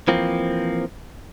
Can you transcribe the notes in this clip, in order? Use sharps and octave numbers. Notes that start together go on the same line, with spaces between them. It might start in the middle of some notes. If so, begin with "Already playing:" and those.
E3 F3 A#3 C4